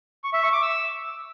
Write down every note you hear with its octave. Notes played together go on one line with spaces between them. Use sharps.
C#6
E5
C#6
D6
E6